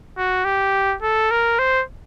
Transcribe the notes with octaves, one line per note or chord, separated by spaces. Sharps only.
F#4
G4
A4
A#4
C5